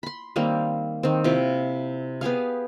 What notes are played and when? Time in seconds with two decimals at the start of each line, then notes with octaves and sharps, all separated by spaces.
0.03 B5 C6
0.36 D#3 G3 A#3 C4
1.03 D#3 C4
1.24 C3 E4 F4 G5
2.21 B3 G4 G#4 F5